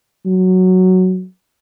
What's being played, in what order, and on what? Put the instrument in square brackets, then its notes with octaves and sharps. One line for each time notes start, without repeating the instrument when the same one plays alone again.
[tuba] F#3